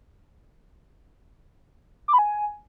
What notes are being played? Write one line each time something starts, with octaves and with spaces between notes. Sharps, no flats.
D6
B5
G#5